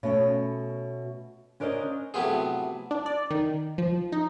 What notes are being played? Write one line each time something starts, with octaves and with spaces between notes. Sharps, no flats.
B2 A3 C#4
C#4 D4 A#4 C5 D5 D#5
A2 C3 F#3 B3 F4 G#4
D4
D5
D#3
F3
D#4